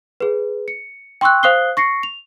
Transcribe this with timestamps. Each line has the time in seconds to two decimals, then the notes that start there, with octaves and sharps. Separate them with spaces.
0.20 G#4 B4
0.68 C#7
1.21 G5 C6 C#6 E6 F#6
1.43 C5 F5 D#6 F#6 C7 G7
1.77 C#6 A#6 C7 C#7
2.03 F7